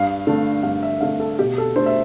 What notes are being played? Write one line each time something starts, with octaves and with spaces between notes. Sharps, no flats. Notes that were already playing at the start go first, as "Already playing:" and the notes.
Already playing: G2 F5
D3 A3 D4
G2 F5
E5
D3 A3 D4 F5
A4
B2 G4
A4
A3 D4 C5
E5